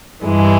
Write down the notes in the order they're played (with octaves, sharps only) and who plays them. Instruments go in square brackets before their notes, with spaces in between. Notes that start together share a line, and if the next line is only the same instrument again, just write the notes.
[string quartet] G2 E3 G#3